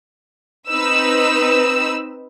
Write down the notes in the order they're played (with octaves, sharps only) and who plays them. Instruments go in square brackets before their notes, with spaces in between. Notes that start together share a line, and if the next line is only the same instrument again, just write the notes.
[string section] C4 D#4 B4 E6